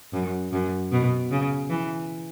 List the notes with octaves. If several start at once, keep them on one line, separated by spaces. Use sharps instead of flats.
F#2
F#2
B2
C#3
E3